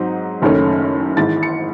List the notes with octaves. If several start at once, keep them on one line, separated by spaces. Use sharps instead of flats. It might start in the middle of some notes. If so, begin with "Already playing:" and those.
Already playing: G#2 F#3 C4 D#4
F#1 F#2 D#3 A3 C#4
G#1 G#2 E3 A6
C#7